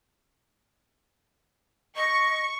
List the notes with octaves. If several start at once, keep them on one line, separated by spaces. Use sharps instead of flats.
D#5 C#6